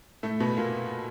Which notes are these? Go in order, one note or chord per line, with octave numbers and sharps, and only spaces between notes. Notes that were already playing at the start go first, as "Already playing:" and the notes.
A2 A3
B2 B3
A#2 A#3